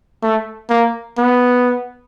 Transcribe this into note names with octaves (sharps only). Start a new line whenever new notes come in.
A3
A#3
B3